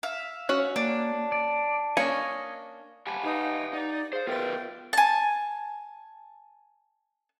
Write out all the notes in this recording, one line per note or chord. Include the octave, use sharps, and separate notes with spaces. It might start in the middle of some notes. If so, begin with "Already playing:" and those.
E5 F5
C#4 F#4 F#5 F6
A#3 D4
D5
A#3 C#4 D4 D#5 G#5 C#6
G4 F#5 G#5 A5 B5
D#4 G4 B4 F5
D#4 D5
G#4 C5 F5
B3 F4 A#4 B4 E5 G5 A6
G#5 A5